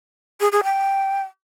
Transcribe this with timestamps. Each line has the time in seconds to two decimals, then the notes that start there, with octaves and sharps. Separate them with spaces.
0.40 G#4
0.52 G#4
0.64 G5